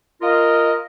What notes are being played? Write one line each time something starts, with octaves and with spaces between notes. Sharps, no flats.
F4 A#4 D#5